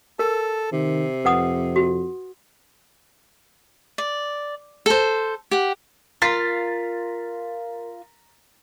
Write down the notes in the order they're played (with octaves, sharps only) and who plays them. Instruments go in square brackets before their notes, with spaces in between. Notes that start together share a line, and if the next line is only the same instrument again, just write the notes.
[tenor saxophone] A4 [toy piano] A#4
[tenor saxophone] C3 [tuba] D#3
[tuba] F2 [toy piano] B4 F#5 D#6
[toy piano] F#4
[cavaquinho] D5
A4 C5
G4 F#5
[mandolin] F4 [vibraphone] A#4 [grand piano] A#5 A6 B6